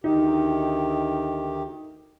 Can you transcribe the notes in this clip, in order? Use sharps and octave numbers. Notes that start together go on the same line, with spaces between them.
D2 D#3 D#4 G4